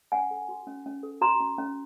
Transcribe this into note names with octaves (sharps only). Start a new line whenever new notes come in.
C#4 F#5 G#5
A4
F#4
C#4
C#4
A4
F#4 A#5 C6
C#4
C#4